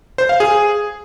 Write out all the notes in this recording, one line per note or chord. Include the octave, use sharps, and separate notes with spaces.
C5
F5
G#4